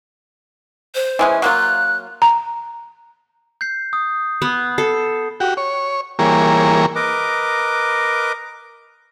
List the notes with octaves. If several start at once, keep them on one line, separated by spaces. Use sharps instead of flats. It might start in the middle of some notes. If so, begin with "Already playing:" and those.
C5
E3 G#3 C#4
F#3 A#3 F4 F#6
A#5
G6 C7
D#6
B3
A4 C7
F#4 G4
C#5
E3 G3 A#3 G#4 A#4 C#5
A#4 B4 D#5 D6